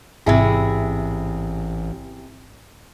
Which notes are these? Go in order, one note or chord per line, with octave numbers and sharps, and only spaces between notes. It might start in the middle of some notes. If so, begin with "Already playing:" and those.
A1 G#2 C3 E4 G#4